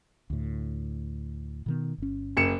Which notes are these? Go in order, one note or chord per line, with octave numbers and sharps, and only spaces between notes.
D2 A2
B2 D#3 B3
G1 C#4
F#1 C#7 E7